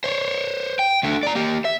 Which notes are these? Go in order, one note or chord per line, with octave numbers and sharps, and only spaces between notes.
C5 C#5
G5
D2 D3
D5 A#5
A#3 G4
E5